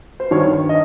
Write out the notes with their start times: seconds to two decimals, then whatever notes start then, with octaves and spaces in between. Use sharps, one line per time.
0.20 C5
0.31 G2 D#3 C#5
0.69 D#5